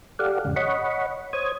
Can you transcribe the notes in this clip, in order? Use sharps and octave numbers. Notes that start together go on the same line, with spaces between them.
G4 A4 D5 F5 F#5
E2 G#2 C#3
C#5 D#5 F#5 B5 C#6
C5 C#5 D#6 G#6